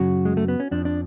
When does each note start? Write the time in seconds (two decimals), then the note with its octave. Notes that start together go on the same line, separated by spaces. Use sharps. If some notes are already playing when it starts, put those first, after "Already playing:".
Already playing: F#2 C#3 F#3 F#4
0.25 G#3
0.37 A3
0.48 B3
0.60 C#4
0.71 F2 F3 D4
0.85 D4